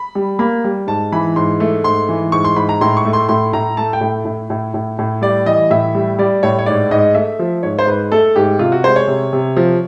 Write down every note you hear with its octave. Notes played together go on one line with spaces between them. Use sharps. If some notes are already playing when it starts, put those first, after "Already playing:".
Already playing: B5
G3
A#3 B5
G3
G#2 A5
E3 B5
G#2 C6
A3
G#2 C6
E3
G#2 C#6
C6
G#2 B5
A#5
A2 C6
C#6
A3
C6
A2 C6
A2 A#5
A3 A5
G5
A2
A2
A2
A2
A2
G3 D5
E3 D#5
A2 E5
G3
G3 D5
A2 C#5
C#5
G#2 D5
G#2 D#5
A3 E5
F3
G#2 C#5
C5
G#2 B4
A3 A4
G#2 G4
C3 F4
F#4
G#3 C5
C#5
C3
C3
F3